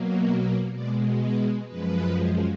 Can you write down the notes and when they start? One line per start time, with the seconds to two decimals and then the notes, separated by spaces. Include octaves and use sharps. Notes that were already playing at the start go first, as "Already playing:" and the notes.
Already playing: B2 F#3 A#3
0.72 B2 G#3 D5
1.21 B4
1.68 F#2 F3 G#3 B4